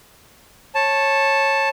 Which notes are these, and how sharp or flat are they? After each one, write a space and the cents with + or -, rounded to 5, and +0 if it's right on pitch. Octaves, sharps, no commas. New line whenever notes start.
C#5 -15 A5 +0